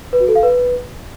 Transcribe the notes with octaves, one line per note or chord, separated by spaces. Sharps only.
B4
F#4
A4
F5
B4